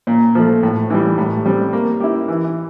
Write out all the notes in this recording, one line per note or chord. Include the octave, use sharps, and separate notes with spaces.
A#2
F3 A3
A2
E3 G3
A2
G3 C4
A#3
E4 G4
E3